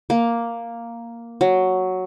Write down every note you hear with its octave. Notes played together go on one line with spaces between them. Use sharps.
A#3
F#3